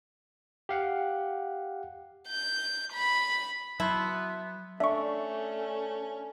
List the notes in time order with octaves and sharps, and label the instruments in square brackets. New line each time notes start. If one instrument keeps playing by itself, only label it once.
[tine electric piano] G4 F5 F#5
[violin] G6
B5
[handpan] F#3 [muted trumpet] B3 [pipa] E4 [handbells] A5 C6
[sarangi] A3 [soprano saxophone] C#4 [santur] D4 [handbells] E5 C#6